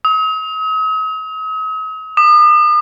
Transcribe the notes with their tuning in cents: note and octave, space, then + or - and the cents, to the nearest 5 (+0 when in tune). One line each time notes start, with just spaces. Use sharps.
D#6 +45
D#6 -45